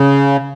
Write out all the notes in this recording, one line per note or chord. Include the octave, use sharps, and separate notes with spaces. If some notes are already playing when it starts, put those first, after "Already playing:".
Already playing: C#3